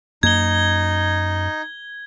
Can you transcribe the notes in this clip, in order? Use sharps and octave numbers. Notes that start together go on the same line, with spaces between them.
F#2 A#3 D#4 G#6 G7